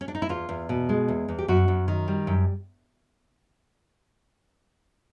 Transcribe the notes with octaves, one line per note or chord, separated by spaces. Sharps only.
C#4
D4
D#4
E4
E2 F4
E2
B2
G#3
E2
E2
G4
F#2 F#4
F#2
D#3
G3
F#2